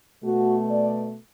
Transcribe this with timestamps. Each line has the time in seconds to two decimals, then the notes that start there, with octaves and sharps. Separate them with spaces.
0.24 B2 A3 F#4
0.70 D5